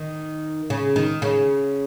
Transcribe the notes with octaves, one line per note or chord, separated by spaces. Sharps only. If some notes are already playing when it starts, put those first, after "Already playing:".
Already playing: D#3
C#3
D#3
C#3